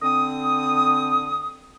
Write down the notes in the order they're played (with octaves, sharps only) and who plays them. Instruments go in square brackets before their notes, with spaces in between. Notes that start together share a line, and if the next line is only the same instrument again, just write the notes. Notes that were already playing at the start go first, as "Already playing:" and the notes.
[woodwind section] D3 C4 D#6